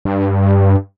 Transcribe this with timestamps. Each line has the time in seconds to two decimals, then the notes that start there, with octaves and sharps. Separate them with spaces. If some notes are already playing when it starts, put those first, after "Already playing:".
0.05 G2